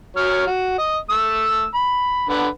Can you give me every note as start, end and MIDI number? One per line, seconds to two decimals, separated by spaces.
0.16 0.44 54
0.16 0.44 73
0.16 0.44 89
0.47 0.76 66
0.78 0.97 75
1.10 1.67 57
1.10 1.67 88
1.74 2.26 83
2.29 2.47 50
2.29 2.47 71
2.29 2.47 78